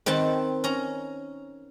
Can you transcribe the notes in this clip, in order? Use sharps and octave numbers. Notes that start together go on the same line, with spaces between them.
D#3 C4 B4 A5
C#4 A#5